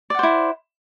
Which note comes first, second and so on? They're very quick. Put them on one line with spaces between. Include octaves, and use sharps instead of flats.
D5 F#5 C5 E4